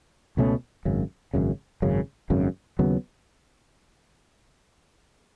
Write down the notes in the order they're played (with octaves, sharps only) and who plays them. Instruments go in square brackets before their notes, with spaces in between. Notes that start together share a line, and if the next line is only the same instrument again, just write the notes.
[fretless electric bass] C#2 B2 A3 C#4
G#1 F#2 C#3
G#1 F#2 C#3
G#1 F#2 C#3
G#1 F#2 C#3
D#2 C#3 F#3 B3